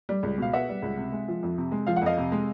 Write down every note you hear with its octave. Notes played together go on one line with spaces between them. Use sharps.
G3
C#2
B2 F5
B3 E5 F#5
G3
C#2
C3
G#3
F3
F2
C3
G#3
F3 F5
F#5
F2 D#5 F5
C3
G#3